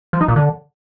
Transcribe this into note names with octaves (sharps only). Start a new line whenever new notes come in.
F3
D#4
A#2
D3